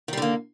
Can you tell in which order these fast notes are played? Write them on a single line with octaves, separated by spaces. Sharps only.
D#3 G3 D3 A#3